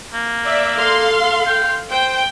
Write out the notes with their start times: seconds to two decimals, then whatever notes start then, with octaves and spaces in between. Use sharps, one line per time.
0.14 A#3
0.45 D5 E5
0.78 A4 F5 C6
1.47 G5
1.91 C5 G5